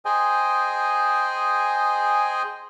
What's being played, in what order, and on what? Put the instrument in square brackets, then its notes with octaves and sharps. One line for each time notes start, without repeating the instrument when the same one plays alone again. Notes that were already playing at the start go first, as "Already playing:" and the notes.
[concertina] G#4 C5 D#5 G5 G#5